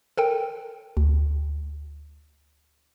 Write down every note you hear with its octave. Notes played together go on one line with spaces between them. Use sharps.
A4 A#4 G5
D2